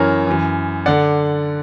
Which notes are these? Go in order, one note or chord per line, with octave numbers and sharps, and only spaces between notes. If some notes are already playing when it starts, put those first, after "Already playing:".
Already playing: F#2 E3 A#4 C#5
F#2 E3
D3 D5 F#5